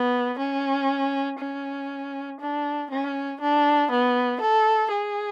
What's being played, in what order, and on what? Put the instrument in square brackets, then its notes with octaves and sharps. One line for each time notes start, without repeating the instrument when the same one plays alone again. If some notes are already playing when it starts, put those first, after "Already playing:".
Already playing: [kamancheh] B3
C#4
C#4
D4
C#4
D4
B3
A4
G#4